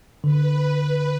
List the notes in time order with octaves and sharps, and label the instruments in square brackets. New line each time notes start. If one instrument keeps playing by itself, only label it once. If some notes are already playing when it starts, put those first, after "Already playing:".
[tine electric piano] D3 [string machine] B4